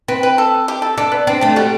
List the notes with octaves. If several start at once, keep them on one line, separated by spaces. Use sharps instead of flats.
C4 B4
B4
A4
G4
A4
D4 A4
B3
C4 D4
A3 D4
G3 F#4